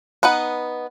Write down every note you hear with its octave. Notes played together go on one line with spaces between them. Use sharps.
B3 D#4 B4 F#5